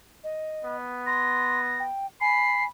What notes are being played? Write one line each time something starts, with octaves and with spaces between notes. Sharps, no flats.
D#5
B3
C6 A#6
G5
G#5 B5 C7